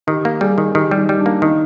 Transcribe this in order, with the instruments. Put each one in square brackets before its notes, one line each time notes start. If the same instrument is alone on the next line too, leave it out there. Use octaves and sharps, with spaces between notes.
[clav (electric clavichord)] D#3 [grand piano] G4
[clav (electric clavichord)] A#3
[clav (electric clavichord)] G3 [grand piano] G#4
[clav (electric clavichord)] D#3
[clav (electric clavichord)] D#3 [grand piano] G4
[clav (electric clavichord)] G3
[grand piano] D#4
[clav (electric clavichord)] G3
[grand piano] D4
[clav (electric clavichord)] A#3
[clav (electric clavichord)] D#3 [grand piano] D#4